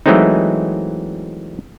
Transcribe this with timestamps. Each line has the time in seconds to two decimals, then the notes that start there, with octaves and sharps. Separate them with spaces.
0.06 E3 F#3 G#3 A3 C4 D#4